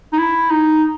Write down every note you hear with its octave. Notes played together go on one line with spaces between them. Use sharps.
D#4
E4
D#4